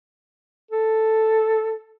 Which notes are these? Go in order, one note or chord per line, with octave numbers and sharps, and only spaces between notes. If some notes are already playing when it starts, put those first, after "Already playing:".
A4